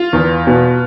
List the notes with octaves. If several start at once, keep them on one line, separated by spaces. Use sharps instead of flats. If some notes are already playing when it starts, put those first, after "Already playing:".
Already playing: F4
E2
B2